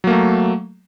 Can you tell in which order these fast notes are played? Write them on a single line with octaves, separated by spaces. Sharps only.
F#3 A#3 A3